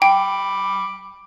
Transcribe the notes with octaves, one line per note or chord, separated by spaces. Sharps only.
G5 B5 D6